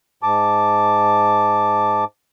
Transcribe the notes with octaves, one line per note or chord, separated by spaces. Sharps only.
G#2 A5 D6